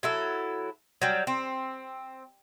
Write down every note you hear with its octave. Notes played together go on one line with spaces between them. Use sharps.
F#3 E4 A4
F#3 G3
C4